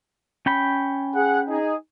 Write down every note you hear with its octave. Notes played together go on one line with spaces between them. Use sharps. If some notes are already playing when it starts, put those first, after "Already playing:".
C#4 G5 B5
G#4 F#5
D#4 G#4